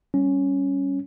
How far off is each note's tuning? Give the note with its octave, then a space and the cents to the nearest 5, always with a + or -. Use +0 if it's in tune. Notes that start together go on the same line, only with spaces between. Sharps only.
G3 +5 C#4 +0